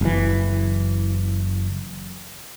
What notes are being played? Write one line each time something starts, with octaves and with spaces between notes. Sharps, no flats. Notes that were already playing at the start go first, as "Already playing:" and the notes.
F#1 E3